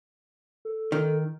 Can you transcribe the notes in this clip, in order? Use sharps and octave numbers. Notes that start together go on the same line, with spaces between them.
A4
D#3